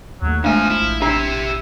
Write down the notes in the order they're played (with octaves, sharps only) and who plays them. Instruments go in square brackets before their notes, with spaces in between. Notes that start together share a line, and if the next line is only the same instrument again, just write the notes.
[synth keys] D#2 A3 [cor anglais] F#3
[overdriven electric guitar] E2 G#5 [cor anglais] F3 [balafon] G#3 A3 D4 [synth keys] F5
[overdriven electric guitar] E4
[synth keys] A1
[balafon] D4 [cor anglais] E4 [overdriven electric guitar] G4 E5